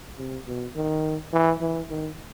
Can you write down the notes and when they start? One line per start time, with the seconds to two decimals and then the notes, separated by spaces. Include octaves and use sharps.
0.18 C3
0.47 B2
0.76 D#3
1.33 E3
1.61 E3
1.90 D#3